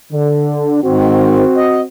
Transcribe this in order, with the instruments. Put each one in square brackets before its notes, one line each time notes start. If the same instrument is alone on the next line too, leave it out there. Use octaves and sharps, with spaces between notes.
[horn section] D3
[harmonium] G#2 D#3 [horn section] C4 F#4
[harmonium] D#5